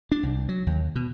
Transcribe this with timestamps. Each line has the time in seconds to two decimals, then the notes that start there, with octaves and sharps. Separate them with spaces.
0.12 D4
0.23 C2
0.49 F#3
0.67 D#2
0.95 B2